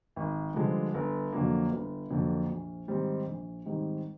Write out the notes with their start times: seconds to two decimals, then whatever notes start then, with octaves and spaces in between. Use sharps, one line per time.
0.16 G#1
0.54 G2 D3 F3 G#3
0.94 G1
1.32 F2 D3 F#3 A#3
1.71 G1
2.11 F2 D3 F#3 A#3
2.50 A#1
2.88 G#2 D#3 G3 C4
3.27 A#1
3.66 G#2 D#3 G3 C4